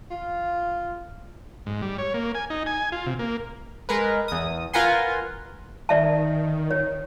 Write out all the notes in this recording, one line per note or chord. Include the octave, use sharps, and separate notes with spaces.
F4
G#2
G3
C#5
A#3
G#5
D#4
G#5
F4
C3
A#3
G#3 A#4 B4
E2 D#6
F4 A#4 B4 F#5 G#5 C6
D#3 D5 E5 A5
C#5